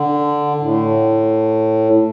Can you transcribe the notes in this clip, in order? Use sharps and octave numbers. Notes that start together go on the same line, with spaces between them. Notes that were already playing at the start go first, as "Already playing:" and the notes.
Already playing: D3
A2